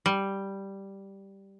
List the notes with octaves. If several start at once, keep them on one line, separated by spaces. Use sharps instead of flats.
G3